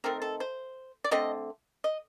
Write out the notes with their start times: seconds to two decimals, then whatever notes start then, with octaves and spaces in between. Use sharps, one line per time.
0.04 D#3 A3 C4 D#4 A#4
0.22 A4
0.40 C5
1.04 D5
1.11 D3 A3 C4 D#5
1.84 D#5